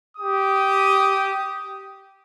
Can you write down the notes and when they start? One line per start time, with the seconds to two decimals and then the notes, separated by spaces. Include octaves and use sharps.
0.18 G4 D#6